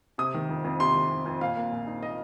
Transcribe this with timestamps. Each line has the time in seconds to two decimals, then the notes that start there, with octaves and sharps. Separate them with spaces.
0.18 C3 D#6
0.34 D#3
0.49 F2
0.64 F2
0.80 C3 C6
0.95 D#3
1.10 F2
1.26 F2
1.41 A#2 F5
1.57 A#3
1.72 A#1
1.87 D#4
2.02 A#2 D#5